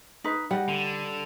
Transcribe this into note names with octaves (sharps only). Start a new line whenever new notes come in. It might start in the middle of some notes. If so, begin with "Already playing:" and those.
D#4 B4
G3 D#5 F#5
D3